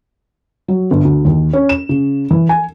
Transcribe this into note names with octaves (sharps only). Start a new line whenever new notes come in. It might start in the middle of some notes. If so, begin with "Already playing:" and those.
F#3
G1
D2
D#2
C#4
E7
C#3
E3
G#5